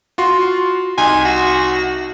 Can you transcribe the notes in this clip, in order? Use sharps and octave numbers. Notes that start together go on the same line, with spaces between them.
F4 F#4 C6
C2 D#4 G#5 C6
F#4